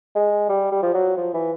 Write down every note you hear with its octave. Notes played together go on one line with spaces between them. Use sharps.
G#3
G3
G3
F3
F#3
F3
E3